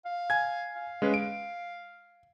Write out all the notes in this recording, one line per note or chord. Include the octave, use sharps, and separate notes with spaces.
F5
G#5 G#6
F5
G#3 C#4 B4
D7